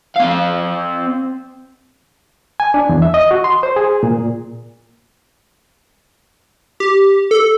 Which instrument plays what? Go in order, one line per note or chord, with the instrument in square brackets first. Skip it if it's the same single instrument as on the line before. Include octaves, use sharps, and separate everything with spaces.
[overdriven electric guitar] C4 F5
[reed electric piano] G#5
D4
E2
E5
D#5
F#4
C6
C5
G#4
A#2
[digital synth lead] G4
A4